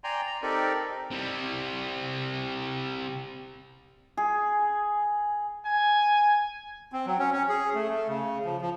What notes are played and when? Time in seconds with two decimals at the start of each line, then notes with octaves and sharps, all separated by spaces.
0.04 D5 G5 G#5 A#5 C6
0.27 A#5
0.42 C4 D#4 G4 A4 A#4 D5
1.11 C3 G3
4.17 G#4
5.65 G#5
6.92 C4
7.06 F#3
7.19 C#4
7.33 C#4
7.49 G#4
7.74 A3
7.89 A3
8.08 C#3
8.45 F3
8.61 F3